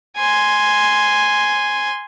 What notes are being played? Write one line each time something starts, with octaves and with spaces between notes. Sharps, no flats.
G#5 C6